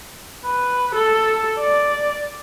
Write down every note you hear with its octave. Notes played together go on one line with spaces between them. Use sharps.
B4
A4
D5